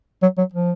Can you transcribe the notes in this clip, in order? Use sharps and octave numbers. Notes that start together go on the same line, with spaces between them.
F#3
F#3
F3